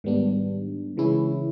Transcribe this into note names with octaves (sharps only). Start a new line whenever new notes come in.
G#2 D#3 G3 B3 D4
C#3 E3 G#3 C#4 E4